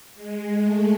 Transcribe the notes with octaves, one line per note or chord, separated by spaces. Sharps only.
G#3
A3